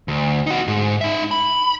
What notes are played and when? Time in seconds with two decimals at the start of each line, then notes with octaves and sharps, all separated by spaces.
0.08 D2
0.47 D#4 F#4
0.68 G#2
1.01 D#4 E5
1.31 B5